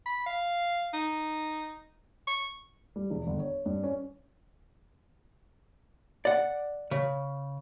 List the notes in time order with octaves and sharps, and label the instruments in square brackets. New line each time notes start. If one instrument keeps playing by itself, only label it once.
[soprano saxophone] B5
F5
D#4
C#6
[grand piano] G3
E1
G1
C#5
G2
C#4
[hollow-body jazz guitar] D5 F#5
C#3